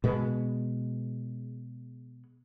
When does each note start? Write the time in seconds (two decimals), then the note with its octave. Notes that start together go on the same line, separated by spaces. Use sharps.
0.04 B2 G#3 B3